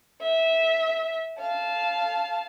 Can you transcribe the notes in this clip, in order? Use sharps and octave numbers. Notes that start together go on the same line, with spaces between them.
E5
F5 A5